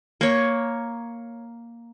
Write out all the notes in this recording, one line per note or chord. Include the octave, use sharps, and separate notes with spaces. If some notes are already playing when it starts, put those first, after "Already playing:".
A#3 C#5